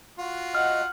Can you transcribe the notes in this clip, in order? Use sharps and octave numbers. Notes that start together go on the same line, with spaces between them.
F4 F#4
D#5 F#5 F6